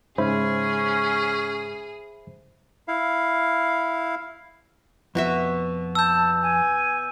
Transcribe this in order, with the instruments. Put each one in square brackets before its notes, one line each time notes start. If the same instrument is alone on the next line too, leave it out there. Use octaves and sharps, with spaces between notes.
[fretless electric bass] G#2 C#3 [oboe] C#4 [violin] G#4 [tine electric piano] C5 E5 B5
[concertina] E4 F5
[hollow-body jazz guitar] F2 [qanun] B2 F#4 E5
[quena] A5 [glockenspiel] E6 G6
[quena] G#5